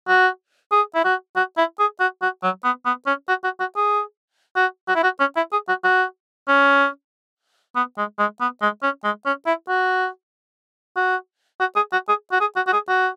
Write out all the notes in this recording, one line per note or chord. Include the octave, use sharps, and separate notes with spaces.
F#4
G#4
E4
F#4
F#4
E4
G#4
F#4
F#4
F#3
B3
B3
C#4
F#4
F#4
F#4
G#4
F#4
F#4
E4
F#4
C#4
E4
G#4
F#4
F#4
C#4
B3
G#3
G#3
B3
G#3
C#4
G#3
C#4
E4
F#4
F#4
F#4
G#4
F#4
G#4
F#4
G#4
F#4
F#4
G#4
F#4